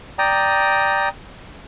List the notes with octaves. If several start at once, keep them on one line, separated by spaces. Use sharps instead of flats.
D5 G5 A#5 D#6